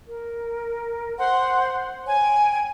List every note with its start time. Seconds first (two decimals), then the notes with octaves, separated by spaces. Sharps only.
0.08 A#4
1.19 C5 F#5 C6
2.06 C#5 G#5
2.22 G5